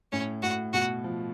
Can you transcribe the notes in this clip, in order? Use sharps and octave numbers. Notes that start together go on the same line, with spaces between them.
A2 C#4
A2 F#4
B2 F#4
F3